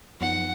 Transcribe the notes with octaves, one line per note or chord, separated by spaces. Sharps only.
F#2 F3 B3 D#4 F#5